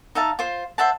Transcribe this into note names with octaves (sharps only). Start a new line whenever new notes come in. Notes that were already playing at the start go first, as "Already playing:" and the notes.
D#4 E5 F5 A5
F4 C5
C5 E5 F#5 A5